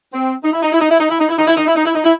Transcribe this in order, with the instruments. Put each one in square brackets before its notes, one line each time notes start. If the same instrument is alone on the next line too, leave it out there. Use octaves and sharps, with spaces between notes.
[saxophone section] C4
D#4
E4
D#4
E4
D#4
E4
D#4
E4
D#4
E4
D#4
E4
D#4
E4
D#4
E4
D#4
E4